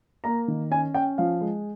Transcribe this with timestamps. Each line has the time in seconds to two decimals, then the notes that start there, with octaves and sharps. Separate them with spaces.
0.24 A#3 A#5
0.48 D#3
0.71 C#4 G#5
0.94 C#4 G5
1.18 F3 F5
1.41 G#3